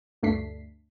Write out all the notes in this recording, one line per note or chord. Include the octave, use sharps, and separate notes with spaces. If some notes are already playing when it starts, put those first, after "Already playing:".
D2 G2 A3 D4 B6 C7